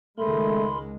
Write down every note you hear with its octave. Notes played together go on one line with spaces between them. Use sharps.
C#2 D#3 G#3 A3 A#4 B5 C6